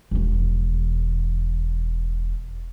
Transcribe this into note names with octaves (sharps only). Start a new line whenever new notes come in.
E1 E2